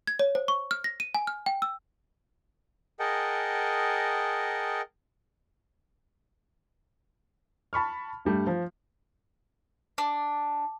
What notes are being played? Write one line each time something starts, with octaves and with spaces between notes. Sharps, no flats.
G#6
C#5
C5
C#6
F6
A#6
D#7
G#5
F6
G5
E6
G#4 A#4 D#5 F#5 G5 A5
A5 B5 C#6 F6
G2 G3 A3
F3
D4